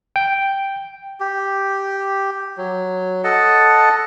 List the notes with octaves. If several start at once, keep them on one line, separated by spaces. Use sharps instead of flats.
G5
G4
F#3
A4 D#5 F#5 A5